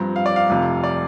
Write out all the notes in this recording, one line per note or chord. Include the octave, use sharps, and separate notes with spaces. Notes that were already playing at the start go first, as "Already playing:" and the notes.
Already playing: G2 F3 C4 A#5
F5
D5
F5
F1 F2 C3
D5